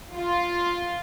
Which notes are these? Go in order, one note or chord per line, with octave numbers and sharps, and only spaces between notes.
F4